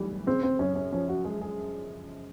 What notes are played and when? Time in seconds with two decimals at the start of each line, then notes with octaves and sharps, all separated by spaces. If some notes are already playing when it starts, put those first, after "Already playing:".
Already playing: B1 A2 E3 G3
0.27 C#3 C4
0.43 C4
0.59 F#2 C#4
0.76 C#4
0.92 F3 C#4
1.09 F#4
1.25 G#3 G#4
1.41 G#4